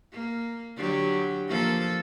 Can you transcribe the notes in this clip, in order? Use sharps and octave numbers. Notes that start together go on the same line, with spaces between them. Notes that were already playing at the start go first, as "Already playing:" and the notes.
A#3
D3 F#3 G4
F3 A#3 A4